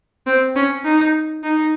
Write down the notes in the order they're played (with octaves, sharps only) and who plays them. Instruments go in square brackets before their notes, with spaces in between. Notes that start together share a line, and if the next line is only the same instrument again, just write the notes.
[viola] C4
C#4
D#4
D#4